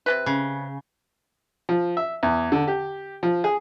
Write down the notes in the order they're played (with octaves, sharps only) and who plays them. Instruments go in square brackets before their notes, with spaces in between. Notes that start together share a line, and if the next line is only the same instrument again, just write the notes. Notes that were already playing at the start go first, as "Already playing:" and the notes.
[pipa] C3 G#3 B4
[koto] C#3
[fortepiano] F3
E5
E2
D3
G4
F3
G#4